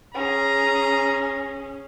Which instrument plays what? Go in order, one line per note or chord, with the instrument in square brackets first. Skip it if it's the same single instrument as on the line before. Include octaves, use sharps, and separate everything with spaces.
[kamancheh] C#4 G#4 [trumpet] A#5